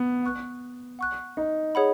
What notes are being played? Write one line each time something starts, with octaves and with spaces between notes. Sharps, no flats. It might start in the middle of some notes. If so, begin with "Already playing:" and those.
Already playing: B3
F#5 C#6 F#6
F#5 C#6 F#6
D#4
G#4 C#5 F#5 B5